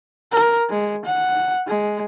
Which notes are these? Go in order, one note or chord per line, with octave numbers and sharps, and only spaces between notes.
A#4
G#3
F#5
G#3